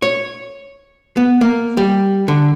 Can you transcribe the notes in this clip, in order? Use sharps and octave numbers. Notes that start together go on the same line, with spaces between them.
C#5
B3
A#3
G3
D3